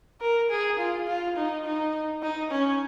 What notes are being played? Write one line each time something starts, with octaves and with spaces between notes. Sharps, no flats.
A#4
G#4
F4
F4
D#4
D#4
D#4
C#4